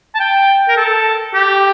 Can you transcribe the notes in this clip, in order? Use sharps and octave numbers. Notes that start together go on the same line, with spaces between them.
A5
G5
A#4
A4
G4